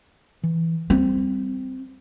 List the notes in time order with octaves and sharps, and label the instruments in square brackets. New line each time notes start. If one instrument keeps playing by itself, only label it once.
[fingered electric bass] E3
[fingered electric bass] G3 [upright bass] C4